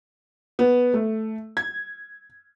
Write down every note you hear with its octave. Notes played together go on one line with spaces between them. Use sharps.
B3
A3
G#6